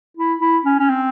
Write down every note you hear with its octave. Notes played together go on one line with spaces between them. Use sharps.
E4
E4
C#4
C#4
C4